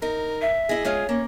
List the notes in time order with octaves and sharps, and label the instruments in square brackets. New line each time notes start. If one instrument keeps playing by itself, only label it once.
[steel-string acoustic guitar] D#4 [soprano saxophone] A#4
[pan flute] E5
[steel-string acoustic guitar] E4 D#5 [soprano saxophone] G#4
[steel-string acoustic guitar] G#3 C#4 F4 [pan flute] C#5
[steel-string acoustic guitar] A#3 [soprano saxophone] C#4